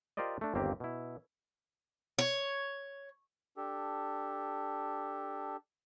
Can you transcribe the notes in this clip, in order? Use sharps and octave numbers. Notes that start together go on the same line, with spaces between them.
F4 G4 A#4 C5 D5 D#5
A3 D4
G1 D#2 A#3 C4 G4
B2 E4
C#5
D4 G4 A4